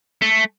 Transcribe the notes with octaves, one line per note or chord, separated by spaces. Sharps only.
A3